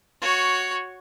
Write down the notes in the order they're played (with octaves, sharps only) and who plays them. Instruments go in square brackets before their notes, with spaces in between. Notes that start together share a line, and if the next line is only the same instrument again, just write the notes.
[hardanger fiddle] F#4 C#5